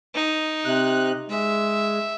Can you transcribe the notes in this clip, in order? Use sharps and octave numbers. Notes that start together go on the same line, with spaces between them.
D#4
C3 F#6
G#3 E5